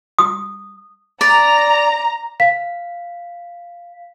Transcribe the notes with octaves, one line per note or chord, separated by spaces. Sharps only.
D#6
D5 A#5
F5 B6